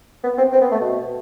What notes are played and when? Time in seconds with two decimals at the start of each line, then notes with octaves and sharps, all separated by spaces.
0.24 B3
0.38 C4
0.52 C4
0.61 B3
0.72 A3
0.81 B2